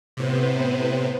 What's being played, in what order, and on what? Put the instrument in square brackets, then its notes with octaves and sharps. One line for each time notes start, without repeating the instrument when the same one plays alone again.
[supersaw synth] A2 C3 [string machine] B3 B4 C5